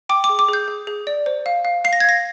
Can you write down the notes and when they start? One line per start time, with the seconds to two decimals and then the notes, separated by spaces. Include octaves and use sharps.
0.09 G5 D6
0.24 D6
0.29 G#4
0.39 D6
0.49 G#4 G6
0.68 G#4
0.87 G#4
1.07 D5
1.26 C5
1.46 F5
1.65 F5
1.84 F5 C7
1.93 A#6
2.00 G#6
2.04 F5 A#6